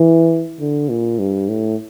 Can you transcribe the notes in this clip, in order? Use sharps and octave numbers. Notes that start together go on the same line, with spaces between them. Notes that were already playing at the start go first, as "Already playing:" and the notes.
Already playing: E3
D3
A#2
G2
A2